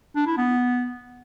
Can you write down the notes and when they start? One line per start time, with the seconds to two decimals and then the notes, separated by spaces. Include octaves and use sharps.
0.16 D4
0.27 E4
0.38 B3